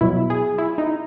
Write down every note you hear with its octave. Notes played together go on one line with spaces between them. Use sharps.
B2 F#3 E4
G#4
E4
D#4